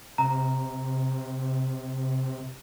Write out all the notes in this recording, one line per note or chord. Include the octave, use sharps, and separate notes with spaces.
C3 A#5